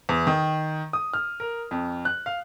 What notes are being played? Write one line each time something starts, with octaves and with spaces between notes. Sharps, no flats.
E2
D#3
D#6
F6
A#4
F2
F#6
F5